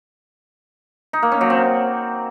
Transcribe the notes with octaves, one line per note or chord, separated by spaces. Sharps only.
D#4
A#3
C#4
F#3
C4